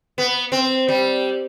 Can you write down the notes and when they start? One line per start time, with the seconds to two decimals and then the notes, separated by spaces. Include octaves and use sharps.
0.18 B3
0.52 C4
0.88 G3